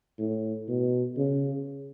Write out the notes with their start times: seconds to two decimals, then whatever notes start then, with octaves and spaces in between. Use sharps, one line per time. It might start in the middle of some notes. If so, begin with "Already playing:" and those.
0.18 A2
0.68 B2
1.17 C#3